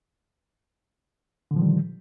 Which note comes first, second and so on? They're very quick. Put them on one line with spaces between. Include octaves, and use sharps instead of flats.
D3 A#2 F3 D#3 G3